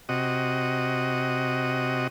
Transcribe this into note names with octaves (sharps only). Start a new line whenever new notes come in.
C3 F#4 D#5